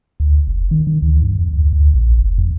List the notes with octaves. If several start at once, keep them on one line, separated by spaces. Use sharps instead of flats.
D2
F#1
D#3
D#3
D2
G2
F2
D2
D2
A#1
F#1
F2